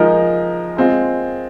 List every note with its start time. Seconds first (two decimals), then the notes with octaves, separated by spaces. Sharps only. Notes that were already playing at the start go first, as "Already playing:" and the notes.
Already playing: F3 G#3 D#4 A#4
0.77 G#3 C4 F4